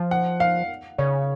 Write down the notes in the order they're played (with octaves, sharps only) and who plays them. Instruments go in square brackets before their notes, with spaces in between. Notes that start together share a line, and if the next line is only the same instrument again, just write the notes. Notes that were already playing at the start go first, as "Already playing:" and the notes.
Already playing: [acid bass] F3
[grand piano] F#5
F5
[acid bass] C#3 [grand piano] C#5